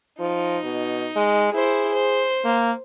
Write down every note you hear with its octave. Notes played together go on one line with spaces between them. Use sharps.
F3 D#4
B2
G#3
E4 G#4 C5
C5
A#3